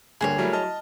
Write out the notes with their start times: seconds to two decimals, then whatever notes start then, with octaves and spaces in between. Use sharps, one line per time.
0.21 D2 G2 A#3 G#4 C5 C#5
0.38 F#3 G3 A3 E4 A#4
0.53 D#5 A5 F6